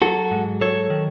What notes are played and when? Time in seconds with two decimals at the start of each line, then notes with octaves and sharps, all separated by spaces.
0.02 F#3 F#4 A4
0.31 G#2
0.61 F#3 A4 C#5
0.90 D#3